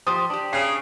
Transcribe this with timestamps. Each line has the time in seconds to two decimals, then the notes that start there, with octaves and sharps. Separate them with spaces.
0.07 F3 G4 C5 D#6
0.30 D4 G4
0.53 C#3 C7